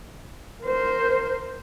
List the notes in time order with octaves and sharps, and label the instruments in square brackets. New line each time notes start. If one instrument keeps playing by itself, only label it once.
[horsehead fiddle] A#4 C5